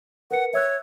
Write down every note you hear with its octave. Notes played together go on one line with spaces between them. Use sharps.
A#4 B4 F#5 C#7
C#5 E5 E6 F#6